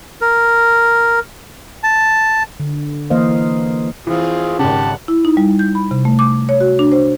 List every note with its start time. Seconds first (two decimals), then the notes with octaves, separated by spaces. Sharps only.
0.21 A#4
1.83 A5
2.60 D3
3.10 E3 A#3 C5 D#5 F5
4.07 E3 C4 F4 G#4
4.59 G#1 C#3 G4 F#5 A5
5.08 E4
5.25 D#4
5.37 G3
5.59 G6
5.75 B5
5.91 C3
6.05 A3
6.19 D6
6.49 C#5
6.61 F#4
6.79 D4
6.92 C5